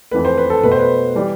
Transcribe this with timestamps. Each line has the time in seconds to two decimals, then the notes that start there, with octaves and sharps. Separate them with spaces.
0.11 F2 E3 A3 B4
0.25 C5
0.38 B4
0.50 A4
0.63 B2 A3 B4
0.72 C5
0.79 B4
1.15 E3 G3